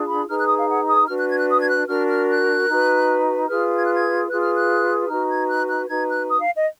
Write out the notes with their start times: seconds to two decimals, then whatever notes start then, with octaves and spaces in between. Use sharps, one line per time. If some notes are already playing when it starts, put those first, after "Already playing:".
Already playing: D4 F4 G#4
0.08 B5
0.28 D#4 G#4 B4 F6
0.38 F#6
0.48 D#6
0.58 F5
0.68 F#5
0.88 D#6
1.08 D4 F#4 B4 F6
1.18 F#6
1.29 G#6
1.38 F#6
1.49 D#6
1.59 G#6
1.68 F#6
1.88 D4 F#4 A#4 F6
2.08 F6
2.28 F#6
2.69 D#4 F#4 B4
3.49 F4 G#4 B4 F6
3.77 G#6
3.85 F#6
3.93 G#6
4.29 F4 G#4 B4 F#6
4.42 F6
4.56 F#6
5.09 D#4 F#4 B4 F6
5.29 G#6
5.48 F#6
5.69 F#6
5.89 D#4 F#4 B4 G#6
6.09 F#6
6.29 D#6
6.42 F5
6.55 D#5